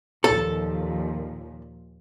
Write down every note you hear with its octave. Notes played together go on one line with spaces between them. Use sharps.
D#2 A#2 F3 A4